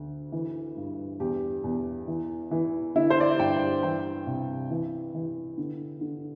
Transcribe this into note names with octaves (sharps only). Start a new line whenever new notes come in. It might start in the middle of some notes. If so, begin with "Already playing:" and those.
Already playing: D2 D3
E3
G2
E2 G4
E2
E3
E3
D3 E4
C5
D5
E5
G2 G5
E3 G5
C2
E3
E3
D3
D3